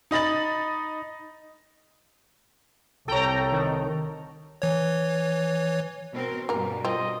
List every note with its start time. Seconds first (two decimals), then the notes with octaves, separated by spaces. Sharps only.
0.11 D#4 D#5 B5 A6 F#7
3.08 C2 A4 C#5 G5 A#5
3.52 D#3
4.62 E3 C#5
6.13 B2 C4 A#4
6.49 G2 B2 G3 A#3 A#4
6.85 C4 F4 D#5